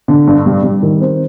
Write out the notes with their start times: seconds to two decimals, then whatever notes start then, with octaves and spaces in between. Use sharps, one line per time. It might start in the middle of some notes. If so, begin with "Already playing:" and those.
0.08 D3
0.27 G2
0.46 G3
0.63 G3
0.83 D#3
1.00 C4